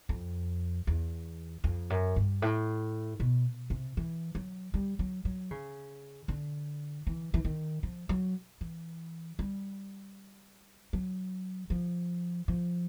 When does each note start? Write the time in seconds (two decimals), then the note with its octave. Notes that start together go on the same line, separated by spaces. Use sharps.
0.09 F2
0.87 E2
1.64 F2
1.90 F#2
2.16 G2
2.42 A2
3.20 B2
3.70 C3
3.97 E3
4.35 F#3
4.74 G3
4.99 F#3
5.25 F#3
5.51 C#3
6.28 D3
7.07 E3
7.34 E3
7.45 D#3
7.83 F3
8.09 F#3
8.61 E3
9.39 G3
10.93 F#3
11.70 F3
12.48 F3